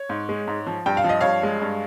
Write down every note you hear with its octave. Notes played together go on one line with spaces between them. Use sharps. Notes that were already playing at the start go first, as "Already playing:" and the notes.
Already playing: C#5
G#2
G#3
G#2
F3
G2 G5
F5
F3
D#5
G2 C#5 F5
G#3
G2